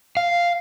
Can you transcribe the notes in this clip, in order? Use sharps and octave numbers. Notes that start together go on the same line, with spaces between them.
F5